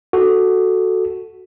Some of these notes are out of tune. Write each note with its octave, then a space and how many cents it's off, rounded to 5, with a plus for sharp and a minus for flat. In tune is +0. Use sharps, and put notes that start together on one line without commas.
F#4 +0 A4 +0